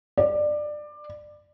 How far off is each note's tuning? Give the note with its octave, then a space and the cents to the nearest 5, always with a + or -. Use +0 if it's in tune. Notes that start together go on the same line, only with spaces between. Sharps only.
D5 +20